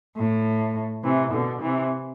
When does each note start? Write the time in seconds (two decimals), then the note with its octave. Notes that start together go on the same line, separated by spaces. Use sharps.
0.16 A2
1.03 C3 E3
1.32 B2 D3
1.61 C3 E3